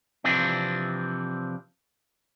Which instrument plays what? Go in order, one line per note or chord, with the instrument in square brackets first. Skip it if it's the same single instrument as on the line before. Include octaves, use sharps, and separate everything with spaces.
[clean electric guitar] C3 E3 F3 C4 D4